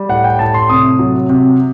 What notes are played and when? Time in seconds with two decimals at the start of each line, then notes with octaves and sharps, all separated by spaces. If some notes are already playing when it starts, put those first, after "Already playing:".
Already playing: G3
0.09 A2 F#5
0.24 G5
0.39 A2 A5
0.54 C6
0.69 C3 D#6
0.99 F#3
1.29 C3